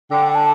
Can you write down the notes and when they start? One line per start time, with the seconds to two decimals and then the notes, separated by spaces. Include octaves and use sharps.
0.11 D3 G5
0.29 G5
0.35 A5